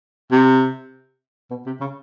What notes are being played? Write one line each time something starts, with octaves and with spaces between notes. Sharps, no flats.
C3
B2
C3
C#3